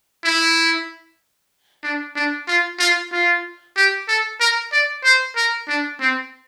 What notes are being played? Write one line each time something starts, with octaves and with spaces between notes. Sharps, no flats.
E4
D4
D4
F4
F4
F4
G4
A4
A#4
D5
C5
A#4
D4
C4